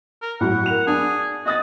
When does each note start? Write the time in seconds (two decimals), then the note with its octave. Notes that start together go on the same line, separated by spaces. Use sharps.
0.22 A#4
0.41 A2 F#3 F#5
0.66 A#4 F7
0.87 D4 G#4
1.46 F#4 D#5 D#6 A6